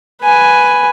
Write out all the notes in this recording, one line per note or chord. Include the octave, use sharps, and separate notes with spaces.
B4 G#5